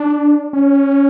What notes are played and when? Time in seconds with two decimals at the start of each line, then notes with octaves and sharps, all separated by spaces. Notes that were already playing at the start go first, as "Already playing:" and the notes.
Already playing: D4
0.53 C#4